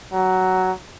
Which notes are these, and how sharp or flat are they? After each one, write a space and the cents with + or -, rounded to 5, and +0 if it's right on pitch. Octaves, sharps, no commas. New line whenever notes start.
F#3 +10